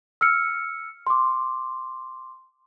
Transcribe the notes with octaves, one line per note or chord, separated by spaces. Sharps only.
E6 F6 C#7
C6 D6